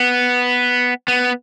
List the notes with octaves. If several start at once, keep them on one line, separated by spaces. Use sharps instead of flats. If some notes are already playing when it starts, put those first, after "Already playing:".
Already playing: B3
B3